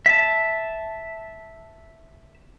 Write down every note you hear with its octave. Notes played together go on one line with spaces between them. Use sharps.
E5 A5